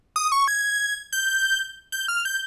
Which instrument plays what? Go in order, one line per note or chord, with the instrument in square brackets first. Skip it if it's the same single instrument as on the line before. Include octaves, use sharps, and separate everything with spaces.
[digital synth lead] D#6
C#6
G#6
G6
G6
F6
G6